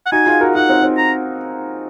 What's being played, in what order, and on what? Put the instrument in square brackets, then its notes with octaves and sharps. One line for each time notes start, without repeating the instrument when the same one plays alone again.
[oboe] F#5
[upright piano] D#4 F#4 [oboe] G#5
[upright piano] F4 G#4
F#4 A#4
[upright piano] D#4 F#4 [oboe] F#5
[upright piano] C4 D#4
C4
[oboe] A#5